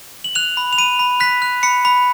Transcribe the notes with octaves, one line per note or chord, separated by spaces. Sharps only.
F#7
F#6 F7
B5
F7
B5 D#7
B5
F#6 B6
F#6
B5 C#7
B5